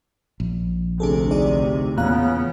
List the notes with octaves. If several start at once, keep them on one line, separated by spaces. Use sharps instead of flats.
A#1
D2 C3 D4 G#4 A4
D#4 G#4 D5
E2 A#2 C#3 B3 F5 A#5 F#6